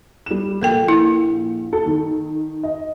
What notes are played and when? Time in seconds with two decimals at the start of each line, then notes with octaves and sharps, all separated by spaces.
0.26 G3 E7
0.62 A#1 A4 A#4 G5
0.88 E4
1.73 A4
1.86 D#3
2.63 D#5